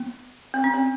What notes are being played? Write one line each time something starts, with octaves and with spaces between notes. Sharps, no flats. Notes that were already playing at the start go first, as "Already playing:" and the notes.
Already playing: B3
C4
C#4
C4